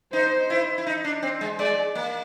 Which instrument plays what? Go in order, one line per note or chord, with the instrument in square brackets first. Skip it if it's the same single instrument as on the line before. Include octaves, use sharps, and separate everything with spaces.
[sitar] D#4 [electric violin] C5
[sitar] E4
E4
D#4
D4
C4
G#3
[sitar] G#3 [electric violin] D5
[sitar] A#3